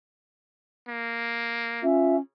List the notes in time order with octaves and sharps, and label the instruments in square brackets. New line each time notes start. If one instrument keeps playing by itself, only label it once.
[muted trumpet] A#3
[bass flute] C#4 [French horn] F4 [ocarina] E5